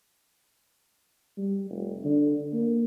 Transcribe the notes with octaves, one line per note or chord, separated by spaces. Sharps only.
G3
F1
D3
A#3